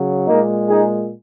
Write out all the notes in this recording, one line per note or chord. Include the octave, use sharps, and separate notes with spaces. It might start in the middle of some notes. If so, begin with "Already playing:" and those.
Already playing: C#3 F#3
A#2 G#3 A#3 D#4
D#4 G#4